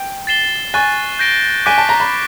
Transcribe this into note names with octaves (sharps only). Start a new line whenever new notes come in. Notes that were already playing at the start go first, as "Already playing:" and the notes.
Already playing: G5
A6 C7 E7 G7
G#5 C#6 F#6 A6
G6 A#6 D7 G7
G#5 D6 F#6 B6 D7 G7
A5
A#5
B5